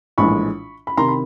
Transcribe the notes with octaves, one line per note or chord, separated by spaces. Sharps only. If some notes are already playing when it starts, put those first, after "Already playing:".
A#1 A2 E3 G#3 B5 C#6
B5
C3 D#3 A#5 C6
B5